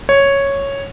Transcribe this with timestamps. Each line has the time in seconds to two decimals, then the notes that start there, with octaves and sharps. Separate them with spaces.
0.09 C#5